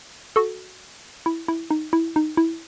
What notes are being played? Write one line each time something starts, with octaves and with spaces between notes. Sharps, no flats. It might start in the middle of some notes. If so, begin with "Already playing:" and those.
F#4 A4
E4
E4
D#4
E4
D#4
E4